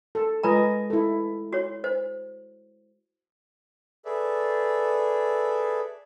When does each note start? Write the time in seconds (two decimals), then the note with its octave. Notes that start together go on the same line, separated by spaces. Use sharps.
0.15 A4
0.43 G#3 F4 B4 D#5 G#5 A#5
0.90 E4 A4
1.53 F#4 C#5
1.84 C5
4.05 G#4 A4 B4 D5 E5